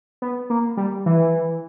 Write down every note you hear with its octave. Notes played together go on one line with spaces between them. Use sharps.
B3
A#3
G3
E3